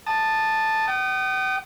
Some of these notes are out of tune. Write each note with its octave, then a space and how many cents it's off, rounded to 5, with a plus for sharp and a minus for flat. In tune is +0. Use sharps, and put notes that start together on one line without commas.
A5 +0 D#6 -30
G5 -45 D#6 -25